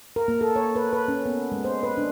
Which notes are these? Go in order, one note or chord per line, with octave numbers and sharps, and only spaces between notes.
A#4
A#3
A4
C#5
B4
B4
C#4
B3
G#3
C5
B4
D4